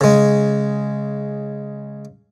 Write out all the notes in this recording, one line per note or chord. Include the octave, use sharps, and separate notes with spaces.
C#3 G#3